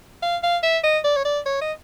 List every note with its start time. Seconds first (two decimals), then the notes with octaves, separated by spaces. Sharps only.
0.22 F5
0.43 F5
0.63 E5
0.83 D#5
1.04 D5
1.16 C#5
1.25 D5
1.46 C#5
1.61 D#5